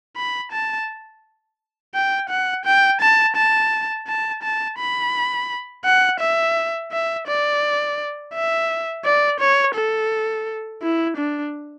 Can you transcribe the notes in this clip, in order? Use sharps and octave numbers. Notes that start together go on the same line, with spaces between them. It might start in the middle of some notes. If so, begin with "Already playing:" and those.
B5
A5
G5
F#5
G5
A5
A5
A5
A5
B5
F#5
E5
E5
D5
E5
D5
C#5
A4
E4
D4